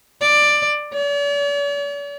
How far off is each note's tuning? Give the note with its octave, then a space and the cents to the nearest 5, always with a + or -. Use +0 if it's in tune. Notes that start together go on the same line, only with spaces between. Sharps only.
D5 +10
D5 -45